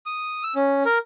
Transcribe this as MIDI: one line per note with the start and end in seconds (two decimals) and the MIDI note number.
0.06 0.43 87
0.43 0.54 88
0.56 0.83 61
0.85 0.98 70